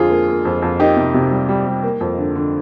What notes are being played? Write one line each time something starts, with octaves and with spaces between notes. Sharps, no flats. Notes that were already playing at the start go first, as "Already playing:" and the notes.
Already playing: F2 D3 F4 G#4
A#3
A#3
F2
F2
A#3 D#4 G4
C3
C3
G3
G3
G3
A#3
F2
D3
D3